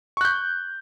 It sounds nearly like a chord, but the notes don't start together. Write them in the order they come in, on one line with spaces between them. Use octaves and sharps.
C#6 F#6 G6